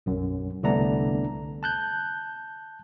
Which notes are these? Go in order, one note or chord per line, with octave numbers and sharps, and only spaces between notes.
B1 F#2
C2 D3 A3 B3 D4 A#5
A5 F#6 G6